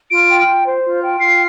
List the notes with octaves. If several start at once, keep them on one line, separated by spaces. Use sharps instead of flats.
F4 D7
G5
F4
C5
F4
G5
F4 C7